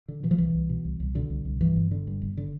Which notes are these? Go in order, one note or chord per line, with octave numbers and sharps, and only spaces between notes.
D3
B2 E3
F3
C2 E3
C2
B2
C2
C2
B2 D3
C2
C2
G2 E3
G1
D3
G2
G1
D3